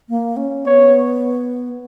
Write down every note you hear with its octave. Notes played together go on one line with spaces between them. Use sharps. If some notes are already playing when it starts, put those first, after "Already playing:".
A#3
C#4
B3 C#5